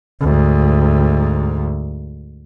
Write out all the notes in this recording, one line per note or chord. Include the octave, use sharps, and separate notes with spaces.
D2 G#2